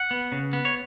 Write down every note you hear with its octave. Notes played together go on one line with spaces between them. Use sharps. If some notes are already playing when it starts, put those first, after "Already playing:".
Already playing: F#5
B3
C#3
B3
C#5